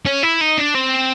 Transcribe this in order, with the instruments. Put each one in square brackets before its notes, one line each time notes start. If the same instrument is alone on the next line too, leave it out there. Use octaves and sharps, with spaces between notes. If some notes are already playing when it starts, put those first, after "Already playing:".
[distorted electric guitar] C#4
E4
D#4
D4
C4